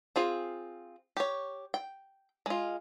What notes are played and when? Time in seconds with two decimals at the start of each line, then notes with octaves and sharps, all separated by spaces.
0.16 C4 F4 G#4
1.17 G4 C#5
1.74 G5
2.46 G#3 F4